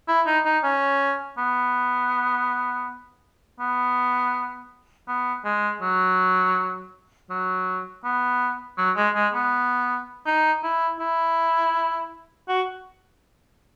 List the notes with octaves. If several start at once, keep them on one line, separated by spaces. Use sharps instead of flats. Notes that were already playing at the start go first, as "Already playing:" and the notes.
E4
D#4
D#4
C#4
B3
B3
B3
G#3
F#3
F#3
B3
F#3
G#3
G#3
B3
D#4
E4
E4
F#4